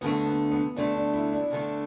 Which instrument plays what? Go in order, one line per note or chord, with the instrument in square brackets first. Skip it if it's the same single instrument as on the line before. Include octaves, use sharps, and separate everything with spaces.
[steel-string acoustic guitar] D2 D3 A3 [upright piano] B3
[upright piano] B3
B3
[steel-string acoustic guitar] D2 D3 A3 [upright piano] D4
[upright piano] D4
E4
D4
[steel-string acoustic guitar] D2 D3 A3